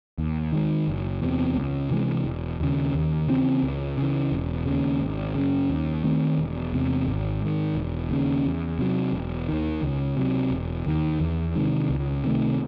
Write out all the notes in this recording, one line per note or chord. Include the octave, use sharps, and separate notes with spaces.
D#2
D#3 G#3
F#1
E2 C3
C#2
C3 E3 G#3
E1
D#2 C#3
D#2
C#3 E3 C4
C#2
C#3 E3
E1
D#2 C#3
G#1
F#2 C#3
D#2
D#3 A3 C4
E1
E2 C3
G#1
G#2 D#3
E1
D#2 C#3
E2
C3 F#3
E1
D#2 D#3
C#2
C3 F#3
E1
D#2 D#3
E2
C3 D#3 G#3
C#2
C3 D#3 A3